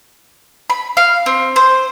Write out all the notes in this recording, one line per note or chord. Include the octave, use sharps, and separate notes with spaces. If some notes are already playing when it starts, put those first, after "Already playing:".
B5
F5
C4
C5